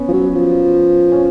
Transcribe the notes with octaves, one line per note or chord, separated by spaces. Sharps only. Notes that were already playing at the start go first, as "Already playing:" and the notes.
Already playing: B3 C#4
F3
F#3
F3
C#4